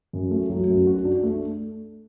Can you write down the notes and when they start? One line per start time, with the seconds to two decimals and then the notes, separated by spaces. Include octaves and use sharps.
0.13 F#2
0.31 A3
0.50 F#3
0.68 F#2
0.87 F#4
1.05 D4
1.23 A3